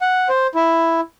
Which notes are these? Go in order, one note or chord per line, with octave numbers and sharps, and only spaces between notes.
F#5
C5
E4